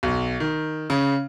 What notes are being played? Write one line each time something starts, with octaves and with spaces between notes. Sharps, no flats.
B1
D#3
C#3